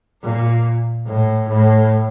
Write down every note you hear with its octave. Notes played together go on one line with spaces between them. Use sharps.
A#2
A2
A2